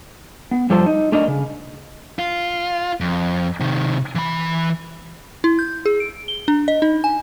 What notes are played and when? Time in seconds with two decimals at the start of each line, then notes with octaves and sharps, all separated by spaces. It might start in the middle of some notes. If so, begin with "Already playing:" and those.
0.51 B3
0.70 F2 F3 G3 A4 C5 A5
0.86 D#4
1.12 A3 D4 A#4 D5 D#5
1.28 C#3
2.19 F4
3.00 F2
3.60 C3 D#3
4.15 E3 B5
5.44 E4
5.59 G6
5.86 G#4
6.00 D7
6.28 G7
6.48 D4
6.68 D#5
6.82 D#4
7.04 G#5